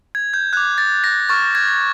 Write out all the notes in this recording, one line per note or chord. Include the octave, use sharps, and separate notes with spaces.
G#6
G6
D6 F#6 G#6
A6
A#6
C#6 F6 A6
G#6